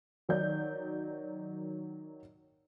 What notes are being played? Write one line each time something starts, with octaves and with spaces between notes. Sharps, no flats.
D#3 F#3 D#4 D5 G6